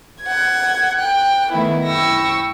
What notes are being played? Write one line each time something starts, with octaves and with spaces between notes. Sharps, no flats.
F#5 G#6
G5 F#6
D#3 A3 B3 E4
F#2 E4 G5 C#6 E6 A#6